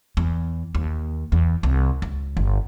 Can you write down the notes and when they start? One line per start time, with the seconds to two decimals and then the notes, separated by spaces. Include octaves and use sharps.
0.17 E2
0.75 D#2
1.32 E2
1.63 C2
2.02 C#2
2.37 G1